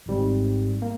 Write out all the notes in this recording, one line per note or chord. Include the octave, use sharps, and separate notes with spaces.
G#1 G#2 G3 C4
A#3